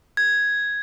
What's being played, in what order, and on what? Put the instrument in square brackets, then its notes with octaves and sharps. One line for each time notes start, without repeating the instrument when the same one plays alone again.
[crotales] G#6